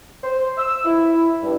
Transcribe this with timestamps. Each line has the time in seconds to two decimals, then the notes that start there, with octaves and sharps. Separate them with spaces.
0.23 C5
0.57 E6
0.85 E4
1.43 G2